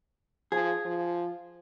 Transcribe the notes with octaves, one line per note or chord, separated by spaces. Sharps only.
F3 G#4
F3